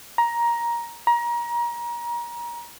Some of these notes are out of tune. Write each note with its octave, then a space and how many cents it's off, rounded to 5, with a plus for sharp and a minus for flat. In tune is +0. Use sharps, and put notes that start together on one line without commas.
A#5 +15
A#5 +30